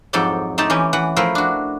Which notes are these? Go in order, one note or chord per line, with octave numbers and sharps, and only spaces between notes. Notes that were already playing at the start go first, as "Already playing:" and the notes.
F2 G#2 F#3 A4 D5 G5
A3 D#4 G4 A5
E3 C#4 G4
E3 F#5
F3 A3 E4 A#4 C5
D4 F#4